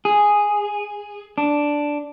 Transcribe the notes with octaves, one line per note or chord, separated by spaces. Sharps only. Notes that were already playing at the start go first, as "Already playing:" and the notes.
G#4
D4